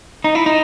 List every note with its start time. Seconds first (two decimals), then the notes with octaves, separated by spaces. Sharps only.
0.24 D#4
0.35 E4
0.46 D#4